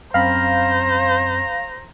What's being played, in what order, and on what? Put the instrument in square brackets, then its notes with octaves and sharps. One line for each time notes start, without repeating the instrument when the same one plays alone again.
[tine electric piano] F#2 C4 B5 [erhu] C5 [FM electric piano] F5 [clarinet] A#5